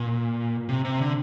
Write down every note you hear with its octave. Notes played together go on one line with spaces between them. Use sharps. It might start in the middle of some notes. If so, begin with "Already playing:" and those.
Already playing: A#2
C3
C3
D3